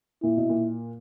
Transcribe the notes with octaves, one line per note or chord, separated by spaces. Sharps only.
A#2 E4
B2
A#2